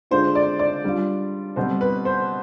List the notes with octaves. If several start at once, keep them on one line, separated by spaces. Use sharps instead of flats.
D3 G#3 D4 F4 C5
D5
D5
G3 D4 F4
B2 G3 C4 C5
B4
C5